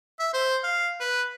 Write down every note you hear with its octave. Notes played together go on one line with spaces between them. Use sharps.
E5
C5
F5
B4